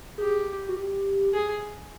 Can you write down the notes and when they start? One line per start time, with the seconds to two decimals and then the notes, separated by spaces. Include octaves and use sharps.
0.18 G4 G#4
0.68 F#4
0.77 G4
1.34 G#4